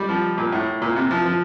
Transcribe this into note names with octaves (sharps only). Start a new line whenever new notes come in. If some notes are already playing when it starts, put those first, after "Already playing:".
Already playing: G3
F3
A#2
A2
A#2
C3
F3
F3